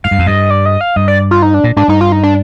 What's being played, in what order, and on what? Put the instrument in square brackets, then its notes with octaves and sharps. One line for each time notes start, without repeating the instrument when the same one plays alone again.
[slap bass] G#2 [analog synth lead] F5
[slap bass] G2
F2
[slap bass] G2 [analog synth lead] D#5
[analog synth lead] D5
D#5
F5
[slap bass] G2 [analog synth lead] D#5
[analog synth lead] D5
F4
D#4
D4
[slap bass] A#2
[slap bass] G#2 [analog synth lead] D4
[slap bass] G2 [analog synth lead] D#4
[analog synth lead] F4
D#4
D4